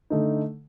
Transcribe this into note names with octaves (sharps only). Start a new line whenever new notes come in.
D3 A3 D#4